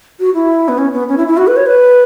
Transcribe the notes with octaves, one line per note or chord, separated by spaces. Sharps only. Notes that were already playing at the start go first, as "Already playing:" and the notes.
F#4
E4
B3
C#4
B3
C#4
E4
E4
F#4
B4
C#5
B4